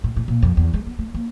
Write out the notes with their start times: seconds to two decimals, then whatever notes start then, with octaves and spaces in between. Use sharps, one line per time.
0.04 A2
0.16 A2
0.28 A#2
0.42 F2
0.57 E2
0.74 G#3
0.87 B3
0.99 A3
1.14 A#3